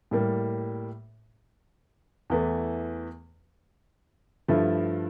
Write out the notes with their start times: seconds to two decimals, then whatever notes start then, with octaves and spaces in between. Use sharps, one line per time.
0.11 A2 G3 A#3
2.30 E2 E3 A3
4.48 G2 F3 A3 E4